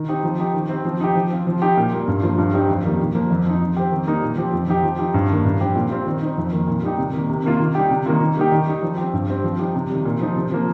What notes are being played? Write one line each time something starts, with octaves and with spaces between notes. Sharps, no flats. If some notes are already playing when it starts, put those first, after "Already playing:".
Already playing: D#3
C4 D#4 G4
F3
D#4 G4
D#3
C4 G4
F3
D#4 G4
F3
C4 F4
F3
D#4 G4
A#2
G3 A#3
G2
F3 A#3 F4
G2
G3 C4 D#4 G4
F2
D#3 G3 A#3 D#4
A#2
F3 A#3
F2
F3 D#4
F3
C4 G4
D#3
G3 A#3 D#4
A#2
F3 C4 G4
F2
F3 D#4 G4
F3
D#4 G4
G2
D#3 A#3
G2
F3 C4 G4
A#2
G3 C4 F4
D#3
C4 D#4
F2
D#3 A#3
A#2
G3 D#4 G4
C3
D#3 A#3
C3
D#3 A#3 F4
D#3
G3 D#4 G4
C3
D#3 A#3 F4
D#3
G3 A#3 D#4 G4
D#3
G3 D#4
F3
C4 G4
G2
G3 C4
F3
D#4 G4
C3
D#3 G3
A#2
F3 D#4
C3
F3 A#3